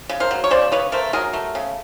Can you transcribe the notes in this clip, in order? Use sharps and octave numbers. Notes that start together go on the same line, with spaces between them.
C#3
A#4 C5
F#3
C#5
C#3 C5 D5
C#3 B4 C#5
A3 A#4 C5
F#3 G#4 A#4
A3
C#3